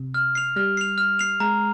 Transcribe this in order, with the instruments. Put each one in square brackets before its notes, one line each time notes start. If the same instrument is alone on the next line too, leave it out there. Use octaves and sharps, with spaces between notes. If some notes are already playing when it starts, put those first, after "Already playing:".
Already playing: [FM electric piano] C3
[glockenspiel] F6
C7 F7
[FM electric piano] G3 [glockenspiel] F6
[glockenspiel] C7 F7
F6
C7 F7
[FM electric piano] G#3 [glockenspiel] A#5